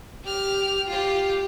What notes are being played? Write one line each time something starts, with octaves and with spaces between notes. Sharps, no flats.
G4 F6
F4 G4